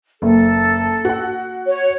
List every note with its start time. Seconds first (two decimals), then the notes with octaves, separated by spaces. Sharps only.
0.22 F#1 A4
1.05 F#4 F#5
1.67 C#5